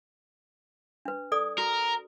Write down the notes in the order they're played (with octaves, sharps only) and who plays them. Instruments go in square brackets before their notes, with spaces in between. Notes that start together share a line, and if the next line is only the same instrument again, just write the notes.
[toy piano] D4 B4
A4 D5 D#6
[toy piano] F#4 [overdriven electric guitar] A#4